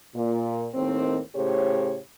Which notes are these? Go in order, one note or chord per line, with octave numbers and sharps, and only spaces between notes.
A#2
D#2 A2 D#3 C4
A2 C#3 G4 C5 C#5